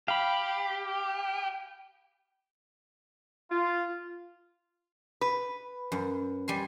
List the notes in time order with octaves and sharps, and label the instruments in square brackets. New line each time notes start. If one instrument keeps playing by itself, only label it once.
[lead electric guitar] G4 [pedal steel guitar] F5 B5
[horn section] F4
[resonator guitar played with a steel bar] B4
[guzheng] F#2
G3 G#5 C6